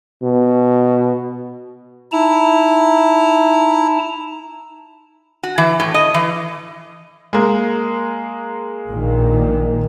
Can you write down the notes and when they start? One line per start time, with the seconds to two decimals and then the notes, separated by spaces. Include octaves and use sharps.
0.23 B2
2.12 D#4 E4 A5 A#5
5.43 F#4
5.58 E3
5.80 A2
5.94 D#5
6.14 E3
7.33 G#3 A#3
8.89 A#1 A#2 D#3